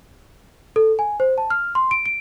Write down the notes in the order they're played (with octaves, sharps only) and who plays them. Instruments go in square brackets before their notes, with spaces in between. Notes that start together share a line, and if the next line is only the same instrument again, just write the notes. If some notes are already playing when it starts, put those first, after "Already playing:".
[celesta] A4
G#5
C5
A5
F6
C6
D7
D7